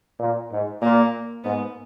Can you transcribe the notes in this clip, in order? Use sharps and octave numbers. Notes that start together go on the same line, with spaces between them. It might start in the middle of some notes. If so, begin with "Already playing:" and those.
A#2
G#2
A#2 A#3
G#2 B3